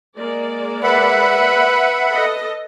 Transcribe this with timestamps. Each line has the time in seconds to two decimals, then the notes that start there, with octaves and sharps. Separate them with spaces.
0.17 G#3 A#3 D5
0.83 B4 E5 F#5 B5
2.14 A4 D#5